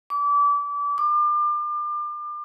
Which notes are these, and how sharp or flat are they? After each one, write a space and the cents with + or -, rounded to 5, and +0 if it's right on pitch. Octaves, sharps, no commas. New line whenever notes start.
D6 -30
D6 +35